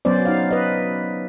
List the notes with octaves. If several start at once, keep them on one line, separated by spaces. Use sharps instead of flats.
F#3 B3 C#4 C5 D5
D#4 F5
B4 D#5